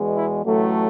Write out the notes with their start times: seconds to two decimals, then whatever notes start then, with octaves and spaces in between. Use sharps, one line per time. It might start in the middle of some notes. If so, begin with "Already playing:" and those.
Already playing: E2 B2 G#3
0.15 E4
0.44 A1 A2 F#3 A3